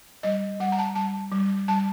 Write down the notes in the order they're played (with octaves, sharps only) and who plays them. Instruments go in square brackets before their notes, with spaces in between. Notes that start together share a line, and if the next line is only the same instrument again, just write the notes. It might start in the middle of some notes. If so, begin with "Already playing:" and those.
[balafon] G3 D#5
G3 F#5
A#5
A5
G3 A5
G3
G3 A5